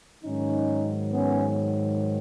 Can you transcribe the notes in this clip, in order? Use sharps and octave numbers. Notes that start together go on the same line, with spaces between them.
G#2 D#3 F#3 C#4 D#4
B3 C#4